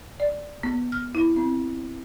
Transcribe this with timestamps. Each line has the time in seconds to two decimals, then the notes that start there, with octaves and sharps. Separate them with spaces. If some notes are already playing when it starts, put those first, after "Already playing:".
0.20 D5
0.63 B3
0.92 F6
1.15 E4
1.36 C4